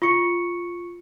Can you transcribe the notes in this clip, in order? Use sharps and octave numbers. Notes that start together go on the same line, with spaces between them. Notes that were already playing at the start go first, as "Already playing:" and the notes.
F4 C#6 C#7